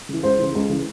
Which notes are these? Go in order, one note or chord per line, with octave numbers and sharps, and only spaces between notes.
C#3 E3
C#2 C5
C#3 E3
C#2
C#3 E3